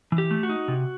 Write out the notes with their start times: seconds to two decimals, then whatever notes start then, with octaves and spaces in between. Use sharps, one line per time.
0.12 E3
0.18 G4
0.31 A3
0.43 F#4
0.49 D#4
0.68 C3